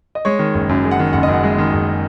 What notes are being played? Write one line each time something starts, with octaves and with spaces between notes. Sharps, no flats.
D#5
G#3 C#5
D#3
F#1
F#2
G#3
F#5
D#3
F#1 F#5
D#5
F#2
F#5
G#3
D#3
F#1